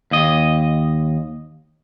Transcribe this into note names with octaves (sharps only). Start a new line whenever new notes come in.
D#2 D#5